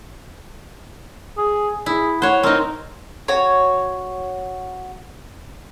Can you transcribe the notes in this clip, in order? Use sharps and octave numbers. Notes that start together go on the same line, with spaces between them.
G#4
E4 G#4
C5 C#5 F#5
C4 D#4 A#4
F#4 C#5